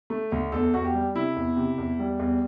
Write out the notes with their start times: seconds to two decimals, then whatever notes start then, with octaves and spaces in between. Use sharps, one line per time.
0.10 A3
0.32 D2
0.52 E2 A4
0.73 E2 F#4
0.84 G4
0.94 G3
1.15 C3 E4
1.36 E2
1.56 C3
1.78 E2
1.99 G3
2.19 E2